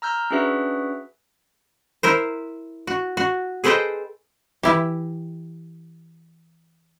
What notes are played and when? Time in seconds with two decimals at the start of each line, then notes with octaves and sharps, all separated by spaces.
0.02 A#5 E6 F6 G6
0.31 C#4 D4 F#4 G#4 B4 E5
2.03 E4 A#4 C5
2.87 F#4
3.17 F#4
3.64 G#4 A4 B4 C5 D#5 G5
4.63 E3 E4 G4